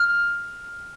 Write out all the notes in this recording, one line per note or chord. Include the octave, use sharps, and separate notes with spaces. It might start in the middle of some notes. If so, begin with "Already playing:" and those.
Already playing: F6